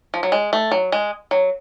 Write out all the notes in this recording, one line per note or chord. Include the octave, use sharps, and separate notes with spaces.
F3
F#3
G#3
A3
F#3
G#3
F#3